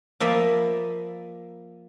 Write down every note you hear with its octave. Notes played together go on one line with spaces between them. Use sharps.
F3 A#3 D#5 E5 A#5 B5